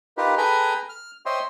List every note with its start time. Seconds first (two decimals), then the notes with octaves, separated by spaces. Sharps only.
0.17 D#4 F4 G4 A#4 B4
0.38 G#4 A4 B4 G5 G#5 A#5
0.89 F6
1.26 C5 C#5 D#5 E5 G5 C6